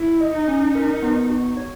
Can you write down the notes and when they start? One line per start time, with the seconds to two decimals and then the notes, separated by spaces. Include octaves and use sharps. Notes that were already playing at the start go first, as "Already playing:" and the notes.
Already playing: E4
0.21 D#5
0.34 D#4
0.48 C#4
0.75 A#4
1.02 B3
1.30 F#4
1.57 C#5